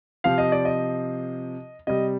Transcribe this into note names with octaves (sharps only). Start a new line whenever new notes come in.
C3 F3 F5
D#5
D5
D#5
C3 G3 D#5